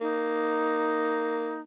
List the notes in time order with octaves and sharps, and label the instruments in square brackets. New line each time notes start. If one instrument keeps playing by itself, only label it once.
[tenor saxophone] A#3 [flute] D#4